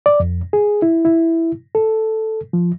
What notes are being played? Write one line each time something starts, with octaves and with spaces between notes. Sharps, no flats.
D5
F2
G#4
E4
E4
A4
F3